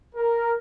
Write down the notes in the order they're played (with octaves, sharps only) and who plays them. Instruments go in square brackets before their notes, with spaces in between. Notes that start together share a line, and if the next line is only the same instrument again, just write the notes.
[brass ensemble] A#4